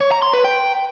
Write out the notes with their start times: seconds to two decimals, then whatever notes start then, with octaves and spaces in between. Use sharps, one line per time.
0.01 C#5
0.11 A#5
0.22 C6
0.33 B4
0.44 G5